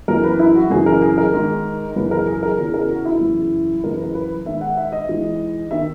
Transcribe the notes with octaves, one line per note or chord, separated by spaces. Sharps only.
F#2 E3 A#4
B4
E4
F#4
F#2 C#3 E3 G#4
A#4
G#4
A#4
G#2 D#3
F#2 C#3 E3 B4
A#4
G#4
A#4
E2 C#3 E3
G#4
A#4
F#4
E4
F#2 C#3 E3
F#2 C#3 E3 A#4
B4
A#4
B4
G#2 D#3 E5
F#5
E5
D#5
G#2 E3
D#3 E5